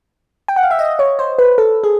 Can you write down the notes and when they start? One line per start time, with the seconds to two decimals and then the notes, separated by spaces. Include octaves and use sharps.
0.48 G5
0.56 F#5
0.63 F5
0.71 E5
0.79 D#5
0.99 C#5
1.19 C5
1.39 B4
1.58 A4
1.84 G#4